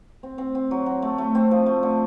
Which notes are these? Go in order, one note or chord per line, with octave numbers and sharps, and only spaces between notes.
C4
C4
C4
F#3
F#3
A3
A3
C4
F3
A3
D3